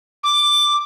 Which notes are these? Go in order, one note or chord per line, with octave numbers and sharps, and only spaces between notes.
D6